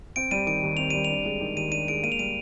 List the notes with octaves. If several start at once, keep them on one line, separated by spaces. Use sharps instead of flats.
C4 D7
G3 D#7
D#3 D7
D#2
C4 F7
G3 D#7
D4 F7
G#3
D#3
D#2 D#7
D4 D#7
G#3 D7
A#3 D#7
F7
G3 D#7